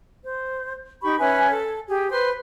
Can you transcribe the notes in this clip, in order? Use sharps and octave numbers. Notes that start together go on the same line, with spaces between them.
C5
D#4 G4 B5 C#6
C#4 B4 E5 G#5
A4
G4 G#4
B4 C5 C6